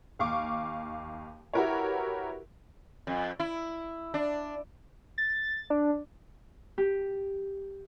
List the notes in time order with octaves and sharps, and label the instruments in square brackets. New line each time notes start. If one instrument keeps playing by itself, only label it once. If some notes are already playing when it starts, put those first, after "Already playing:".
[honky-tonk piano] D#2 F5 C#6 D6
E4 F#4 G4 A#4 B4 C#5
[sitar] F2
E4
D4
[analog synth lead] A6
D4
[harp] G4